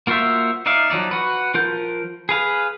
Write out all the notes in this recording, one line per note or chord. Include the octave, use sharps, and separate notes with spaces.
A#3 F4 F#4 C5 E5
D#4 D5 E5 F5
F3 F#3 D#4 D5
F#4 B4
F3 F4 A#4 G6
G#4 B4 F5